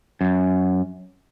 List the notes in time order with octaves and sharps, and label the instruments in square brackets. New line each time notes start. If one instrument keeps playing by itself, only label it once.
[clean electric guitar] F#2